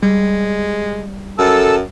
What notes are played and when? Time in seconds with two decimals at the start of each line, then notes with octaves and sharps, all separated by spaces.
0.03 G3 G#3
1.39 F#2 A4 A5 E6